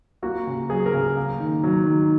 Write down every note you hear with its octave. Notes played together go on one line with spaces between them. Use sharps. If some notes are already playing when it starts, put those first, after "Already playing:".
A#3 F#4
C#3
F#3 G#4
A#4
C#3
A#3
D#3
F#3
D#3